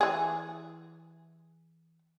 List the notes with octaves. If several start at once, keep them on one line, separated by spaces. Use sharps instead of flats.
E3 G#4